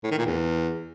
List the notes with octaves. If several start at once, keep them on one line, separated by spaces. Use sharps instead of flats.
A2
D#3
A#2
E2